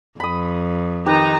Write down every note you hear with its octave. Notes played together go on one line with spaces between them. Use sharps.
F2 B5 D#6
D#3 D#4 G4 B4 A#5